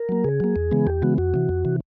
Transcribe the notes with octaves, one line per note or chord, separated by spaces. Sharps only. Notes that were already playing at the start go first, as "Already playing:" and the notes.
Already playing: A#4
F#3 A#3
C#3 G#4
F#3 A#3
E2
C#3 E3 G#3 B3
E2 G4
C#3 E3 G#3 B3 F#4
F2 F#4
C3 E3
F2
C3 E3